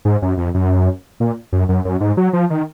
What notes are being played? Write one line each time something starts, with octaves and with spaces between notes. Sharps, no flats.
G#2
F#2
F2
F#2
A#2
F#2
F#2
F#2
G#2
F#3
F3
D#3